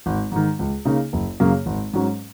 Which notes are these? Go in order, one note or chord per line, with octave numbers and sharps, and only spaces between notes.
G#1
G#2 D#3
C#2
C#3 A#3 D#4
F#1
F#2 C#3 A#3
G#1
G#2 F#3 C#4